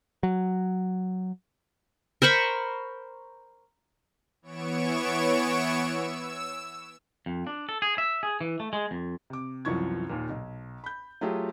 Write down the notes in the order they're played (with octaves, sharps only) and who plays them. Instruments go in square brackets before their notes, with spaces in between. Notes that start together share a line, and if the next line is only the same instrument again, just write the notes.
[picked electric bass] F#3
[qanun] A#4 C5 B5 C#6
[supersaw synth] E3 B3 C#5 C#6 D7 E7
E6
[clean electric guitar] F2
D4
A4
G#4
E5
G#4
E3
A3
G#3
F2
[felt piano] C3 D6
C2 F#2 E3 F3 C#6 G#6
D#2 A#2
B1
B5 G6
F#3 A3 F4 G4 G#4